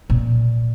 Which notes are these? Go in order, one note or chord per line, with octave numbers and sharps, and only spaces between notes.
A#2